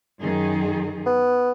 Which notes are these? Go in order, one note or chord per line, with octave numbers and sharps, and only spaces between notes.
F#2 D#3 G#4
B3